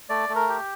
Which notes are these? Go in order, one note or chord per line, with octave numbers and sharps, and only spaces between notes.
A3 D5
A3
A#4
G4